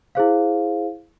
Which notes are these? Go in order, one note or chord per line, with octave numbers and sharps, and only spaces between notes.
E4 G#4 C5 F5